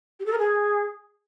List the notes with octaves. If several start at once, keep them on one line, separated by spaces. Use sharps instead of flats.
G4
A4
A#4
G#4